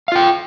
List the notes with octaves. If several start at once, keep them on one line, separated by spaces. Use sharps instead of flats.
F4 F5 G5